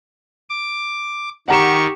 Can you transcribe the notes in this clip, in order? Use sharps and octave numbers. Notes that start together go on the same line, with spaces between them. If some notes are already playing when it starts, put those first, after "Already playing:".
D6
D#3 G4 F#5 A#5 C#6 E7